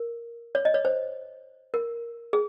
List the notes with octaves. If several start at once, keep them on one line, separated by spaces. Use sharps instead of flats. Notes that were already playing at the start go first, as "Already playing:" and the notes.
Already playing: A#4
C#5
D#5
C#5
C5
A#4
G#4